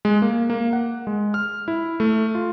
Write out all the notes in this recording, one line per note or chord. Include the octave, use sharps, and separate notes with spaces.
G#3
A#3
A#3
F#5
G#3
F6
E4
A3
F4